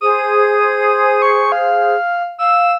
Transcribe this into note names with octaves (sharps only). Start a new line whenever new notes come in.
G#4 C5 D#6
C#6
F5
F5 E6